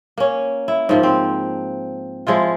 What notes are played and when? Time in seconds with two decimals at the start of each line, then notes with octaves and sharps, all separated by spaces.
0.18 A#3 C#4
0.68 E4
0.89 G#2 F3 A#3
1.03 C4
2.27 F3 G#3 E4 F4